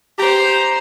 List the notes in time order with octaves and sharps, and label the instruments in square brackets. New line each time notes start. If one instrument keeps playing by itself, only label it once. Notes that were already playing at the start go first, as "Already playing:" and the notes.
[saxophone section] G4 [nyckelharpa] C5 A#5